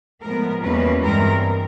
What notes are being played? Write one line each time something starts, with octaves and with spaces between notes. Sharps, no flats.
A2 F3 G#3 B3 A#4
E2 B2 G3 A#3 C#4 B4
G2 E3 G#3 C4 A#4